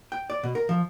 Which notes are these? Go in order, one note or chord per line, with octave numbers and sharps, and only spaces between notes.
G5
D5
B2
A#4
F3